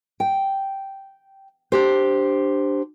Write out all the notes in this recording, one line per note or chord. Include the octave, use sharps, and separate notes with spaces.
G5
D4 G4 C5